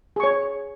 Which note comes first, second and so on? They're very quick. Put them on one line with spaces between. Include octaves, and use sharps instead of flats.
G#4 C#6 C#5